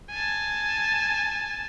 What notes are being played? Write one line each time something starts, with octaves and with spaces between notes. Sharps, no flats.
G#5 A5